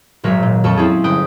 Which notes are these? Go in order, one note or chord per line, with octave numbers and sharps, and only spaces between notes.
D#1 G#1 F#3 A#4 C#5 B6
A#2
F2 A4 C#6
C4 C#4 E4 G#4
G1 B4 G5 D#6